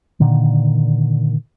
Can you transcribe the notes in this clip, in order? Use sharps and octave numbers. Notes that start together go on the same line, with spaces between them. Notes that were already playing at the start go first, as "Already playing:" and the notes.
A#2 D3 D#3